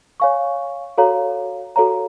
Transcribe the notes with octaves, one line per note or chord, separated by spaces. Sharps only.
C#5 F5 G#5 C#6
F#4 A4 C#5 F5 A#5
F#4 A4 C#5 F5 A#5